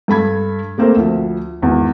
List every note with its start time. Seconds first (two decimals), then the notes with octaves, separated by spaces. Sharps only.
0.08 G2 A4 B5 G#6
0.78 A3 A#3 C4 A4 A#4 C5
0.96 D2 F3
1.62 G#1 E2